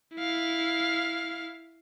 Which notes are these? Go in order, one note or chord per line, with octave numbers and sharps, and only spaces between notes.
E4 F5